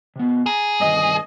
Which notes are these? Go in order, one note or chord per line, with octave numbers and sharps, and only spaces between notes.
C3 B3
G#4 A#5
G2 C3 D#3 D#5